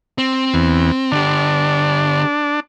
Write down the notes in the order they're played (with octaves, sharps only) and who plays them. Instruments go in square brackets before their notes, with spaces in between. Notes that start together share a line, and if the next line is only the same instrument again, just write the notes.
[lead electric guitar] C4
[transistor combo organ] E2
[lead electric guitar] D3 G4 [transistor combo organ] D4